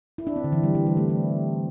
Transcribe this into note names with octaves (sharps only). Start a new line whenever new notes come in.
E4
D4
C4
D3
E3
G3
E3
G3
A3
C4